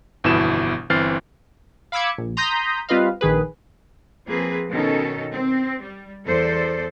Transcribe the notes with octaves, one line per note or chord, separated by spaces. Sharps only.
G1 F2 B2 E3 E4 E7
G1 E3 C4 F6 A6 C7
F5 B5 D6 E6 G#6 C#7
A#1
A#5 C6 D#6 G6 A#6 B6
G3 C4 F4 B4 D#5 F5
A#1 D#3 G#4 B4
F3 A#3 C4 G#4 B4
B2 D#3 C#4 A4
C4
G3
E2 A4 C5 D5